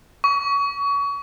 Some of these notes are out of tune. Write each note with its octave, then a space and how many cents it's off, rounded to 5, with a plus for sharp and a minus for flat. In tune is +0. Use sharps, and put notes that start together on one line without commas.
C#6 +30